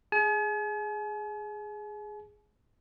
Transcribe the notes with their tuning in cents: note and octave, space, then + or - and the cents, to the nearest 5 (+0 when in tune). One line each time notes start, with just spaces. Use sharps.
G#4 +0 G#5 +45